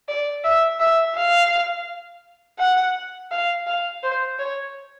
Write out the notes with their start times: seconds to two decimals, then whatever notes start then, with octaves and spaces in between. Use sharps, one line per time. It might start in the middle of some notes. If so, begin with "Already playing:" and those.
0.08 D5
0.44 E5
0.80 E5
1.16 F5
2.59 F#5
3.31 F5
3.67 F5
4.03 C5
4.39 C#5